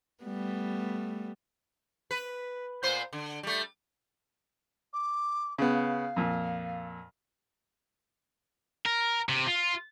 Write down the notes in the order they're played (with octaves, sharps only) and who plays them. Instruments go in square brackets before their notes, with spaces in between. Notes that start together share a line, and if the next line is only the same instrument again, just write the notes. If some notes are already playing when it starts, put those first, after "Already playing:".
[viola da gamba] G3 A3 B3
[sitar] B4
A#2 B3 C5
D3
G3 A3
[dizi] D6
[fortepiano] C#3 B3
[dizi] F5
[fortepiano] F2 A#2
[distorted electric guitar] A#4
C3
F4